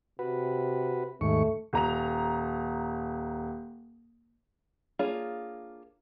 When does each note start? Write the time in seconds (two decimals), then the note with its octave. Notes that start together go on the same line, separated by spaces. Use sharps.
0.19 C3 F#4 B4
1.21 D#2 G#2 A3 C#6
1.73 D#1 A#5 F7
4.99 A#3 D4 F4 G#4 C#5